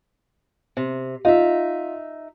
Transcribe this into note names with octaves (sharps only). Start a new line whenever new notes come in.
C3
D#4 F4 E5